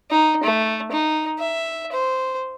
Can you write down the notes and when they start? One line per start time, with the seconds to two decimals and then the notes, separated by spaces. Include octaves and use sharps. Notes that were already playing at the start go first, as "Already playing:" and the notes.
0.11 D#4
0.44 A3
0.92 D#4
1.39 E5
1.92 C5